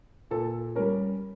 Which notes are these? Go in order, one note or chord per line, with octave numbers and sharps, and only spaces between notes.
A#2 A4
G3 C#4 A#4